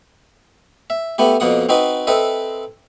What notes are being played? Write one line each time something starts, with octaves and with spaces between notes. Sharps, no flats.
E5
A3 B3 E4 G4
F2 B2 A#3 F#5 D#6
C4 D#4 F#4 B4 D#5
C4 A4 B4 D#5 E5